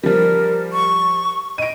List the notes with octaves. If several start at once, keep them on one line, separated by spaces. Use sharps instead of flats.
F3 G3 A#4
C#6
D#5 D7 D#7